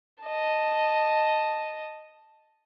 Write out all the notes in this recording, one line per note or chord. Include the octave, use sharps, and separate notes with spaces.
D#5 A5